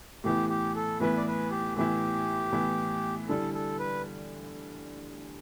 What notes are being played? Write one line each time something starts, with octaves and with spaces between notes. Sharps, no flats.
A2 E3 B3 E4 G4
G4
A4
A2 E3 B3 E4 B4
D5
B4
G4
A2 E3 B3 E4 G4
A2 E3 B3 E4
D3 G3 E4 A4
A4
B4